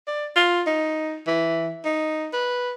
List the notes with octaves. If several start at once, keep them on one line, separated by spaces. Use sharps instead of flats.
D5
F4
D#4
E3
D#4
B4